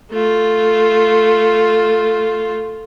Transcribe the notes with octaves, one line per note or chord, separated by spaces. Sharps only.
A3 F4